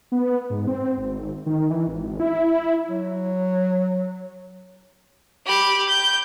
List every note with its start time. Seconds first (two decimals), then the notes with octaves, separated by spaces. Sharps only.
0.12 B3
0.50 G#2
0.67 C4
0.98 G#1
1.46 D#3
1.70 E3
1.87 G#1
2.20 E4
2.89 F#3
5.47 G4 B5
5.89 G6